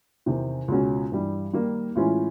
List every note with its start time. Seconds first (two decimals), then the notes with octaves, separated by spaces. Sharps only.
0.26 E2 C3 D#3
0.68 C#2 B2 G#3 C#4 F#4
1.12 G2 E3 G3
1.53 D#3 G3 A#3
1.95 A2 E3 G#3 C#4 F4